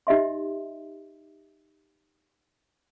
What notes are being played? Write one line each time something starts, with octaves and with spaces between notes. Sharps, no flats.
D#4 G4 D#5 E5 C6